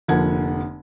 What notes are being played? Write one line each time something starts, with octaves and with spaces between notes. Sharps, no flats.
F1 D3 F3 A#3 F#5 G#6